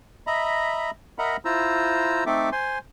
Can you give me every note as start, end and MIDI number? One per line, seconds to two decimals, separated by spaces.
0.27 0.91 75
0.27 0.91 76
0.27 0.91 82
0.27 0.91 83
1.19 1.37 70
1.19 1.37 75
1.19 1.37 76
1.19 1.37 78
1.19 1.37 82
1.19 1.37 83
1.45 2.24 64
1.45 2.24 65
1.45 2.24 72
1.45 2.24 82
1.45 2.24 88
2.26 2.50 57
2.26 2.50 60
2.26 2.50 63
2.26 2.50 69
2.26 2.50 76
2.26 2.50 86
2.52 2.78 72
2.52 2.78 80
2.52 2.78 84